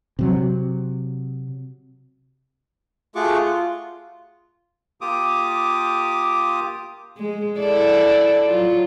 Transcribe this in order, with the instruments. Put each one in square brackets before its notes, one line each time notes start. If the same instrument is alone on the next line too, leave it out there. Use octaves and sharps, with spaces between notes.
[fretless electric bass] C3 F#3
[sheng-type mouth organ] A3 F4 F#4 G#4 C#6 D6
F4
[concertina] A#3 F4 G4 D6 D#6
[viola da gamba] G#3
E4 A4 D5
F#3 F4